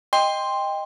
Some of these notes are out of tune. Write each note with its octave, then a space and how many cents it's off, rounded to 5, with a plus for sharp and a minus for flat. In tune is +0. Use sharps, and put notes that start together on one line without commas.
D#5 +0 G5 +20 C6 +0